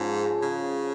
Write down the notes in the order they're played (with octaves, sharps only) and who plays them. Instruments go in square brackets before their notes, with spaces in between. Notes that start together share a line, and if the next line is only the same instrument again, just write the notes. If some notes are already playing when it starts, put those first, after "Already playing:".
Already playing: [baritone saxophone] G#2 [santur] F3 C#4 G#4
[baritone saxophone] C#3